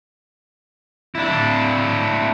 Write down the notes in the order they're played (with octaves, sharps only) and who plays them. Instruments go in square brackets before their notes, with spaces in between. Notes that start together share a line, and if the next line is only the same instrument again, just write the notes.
[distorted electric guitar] D4 E4